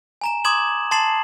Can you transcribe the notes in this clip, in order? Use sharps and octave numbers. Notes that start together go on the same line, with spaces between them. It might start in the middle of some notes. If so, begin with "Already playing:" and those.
G#5 A#5 E7
C6 D6 D#6 G#6 E7 F#7
A5 C6 A6 C7 E7 F#7